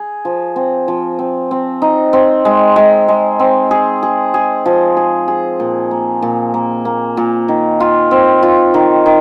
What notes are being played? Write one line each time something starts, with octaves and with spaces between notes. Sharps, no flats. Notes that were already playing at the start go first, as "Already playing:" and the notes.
Already playing: G#4
F3
C4
F3
C4
C4
D#4
C4
G#3
G#3
G#3
C4
G#4
G#4
G#4
F3
G#4
G#4
A#2
A#3
A#2
A#3
A#3
A#2
D#3
F4
C4
F4
D#3
D#3